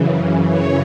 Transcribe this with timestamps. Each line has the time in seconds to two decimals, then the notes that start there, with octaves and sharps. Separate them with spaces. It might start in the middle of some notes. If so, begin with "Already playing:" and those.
Already playing: F#2 C#3 E3
0.48 C#5